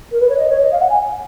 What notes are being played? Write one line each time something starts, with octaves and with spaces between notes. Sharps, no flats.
A#4
B4
C#5
D#5
C#5
D#5
F5
F#5
G#5